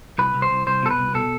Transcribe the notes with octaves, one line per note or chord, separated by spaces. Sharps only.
C2 B4
C2
C5
C2
C2 C5
B2 A4
B4
C2
B2 A4